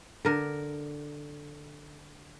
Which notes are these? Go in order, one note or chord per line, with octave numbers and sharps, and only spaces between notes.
D3 A#4